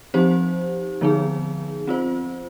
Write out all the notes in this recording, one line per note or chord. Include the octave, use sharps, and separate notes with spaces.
F3 C4 D#4 G4 C5
D3 F3 B3 D#4 G#4
C4 F4 C5